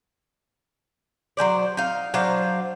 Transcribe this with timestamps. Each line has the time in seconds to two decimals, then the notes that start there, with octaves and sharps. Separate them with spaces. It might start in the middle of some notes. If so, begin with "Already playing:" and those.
1.37 F#3 G#3 C5 D5
1.77 D#4 F5
2.14 F#3 D4 C5 F5